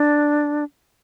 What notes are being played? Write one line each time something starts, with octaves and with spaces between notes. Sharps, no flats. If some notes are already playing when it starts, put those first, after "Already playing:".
Already playing: D4